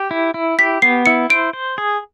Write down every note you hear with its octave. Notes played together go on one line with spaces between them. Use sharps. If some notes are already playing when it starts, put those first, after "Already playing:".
Already playing: G4
E4
E4
G4 B6
B3 C7
E4 C#7
C5 D7
C5
G#4